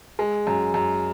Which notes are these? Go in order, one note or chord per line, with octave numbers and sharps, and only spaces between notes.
G#3
F#2
F#2